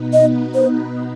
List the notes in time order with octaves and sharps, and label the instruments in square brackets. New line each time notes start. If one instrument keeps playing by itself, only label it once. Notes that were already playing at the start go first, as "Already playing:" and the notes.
Already playing: [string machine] B2 B3 D#4 B4
[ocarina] D#5
C5